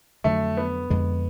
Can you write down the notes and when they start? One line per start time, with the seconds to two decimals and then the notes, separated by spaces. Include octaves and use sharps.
0.24 F2 D3 F#3 A3
0.57 B3
0.90 F2 D3 G#3